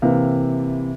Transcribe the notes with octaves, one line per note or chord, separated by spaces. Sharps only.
C3 E3 A#3 E4 F5